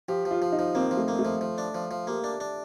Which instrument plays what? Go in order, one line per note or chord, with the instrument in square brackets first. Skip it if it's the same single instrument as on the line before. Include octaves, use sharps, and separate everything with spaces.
[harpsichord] F3 [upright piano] G4
[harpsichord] F3
[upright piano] F4
[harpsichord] F3
[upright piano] D#4
[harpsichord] F3
[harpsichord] A#3 [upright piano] C4
[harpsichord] F3
[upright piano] A3
[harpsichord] A#3
[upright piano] A3
[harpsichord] F3
F3
D4
F3
F3
[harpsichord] A#3 [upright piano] G4
[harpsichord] D4
D4